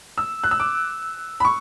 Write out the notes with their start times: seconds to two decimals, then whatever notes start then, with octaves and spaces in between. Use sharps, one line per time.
0.18 E6
0.43 F#6
0.51 E6
0.60 D6
1.40 B5
1.45 C#6